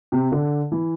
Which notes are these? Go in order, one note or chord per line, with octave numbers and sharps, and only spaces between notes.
C3
D3
E3